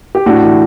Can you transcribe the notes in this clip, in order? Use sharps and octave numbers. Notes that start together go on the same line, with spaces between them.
G4
A2 D4 F#4
E3